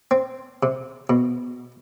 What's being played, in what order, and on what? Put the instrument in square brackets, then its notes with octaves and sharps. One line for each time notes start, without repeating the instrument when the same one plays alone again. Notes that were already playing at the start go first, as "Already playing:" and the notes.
[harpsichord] C4
C3
B2